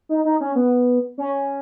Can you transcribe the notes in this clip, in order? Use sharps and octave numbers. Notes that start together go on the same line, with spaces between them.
D#4
D#4
C#4
B3
C#4